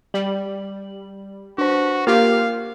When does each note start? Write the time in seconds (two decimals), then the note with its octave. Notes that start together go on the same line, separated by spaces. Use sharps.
0.14 G3 F#7
1.58 D4 F#4 C5
2.07 A#3 F4 G4 A#4 F5